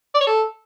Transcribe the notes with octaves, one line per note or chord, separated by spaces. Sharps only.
D5
C#5
A4